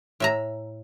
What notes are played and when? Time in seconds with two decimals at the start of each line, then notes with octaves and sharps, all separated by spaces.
0.20 A2 E5 A#5